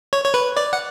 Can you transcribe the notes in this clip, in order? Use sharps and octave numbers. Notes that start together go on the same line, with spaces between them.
C#5
C#5
B4
D5
F#5